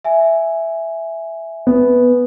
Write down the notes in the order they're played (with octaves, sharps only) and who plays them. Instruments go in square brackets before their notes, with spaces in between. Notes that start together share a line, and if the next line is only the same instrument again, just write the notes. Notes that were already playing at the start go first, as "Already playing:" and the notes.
[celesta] E5 G#5
[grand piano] B3